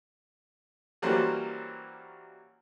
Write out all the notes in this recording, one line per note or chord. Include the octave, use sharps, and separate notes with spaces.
E3 F#3 G3 A#3 C#4 C5